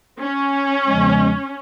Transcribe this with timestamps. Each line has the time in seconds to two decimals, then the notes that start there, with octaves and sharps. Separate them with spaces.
0.19 C#4
0.86 E2 C#3 F3 G#3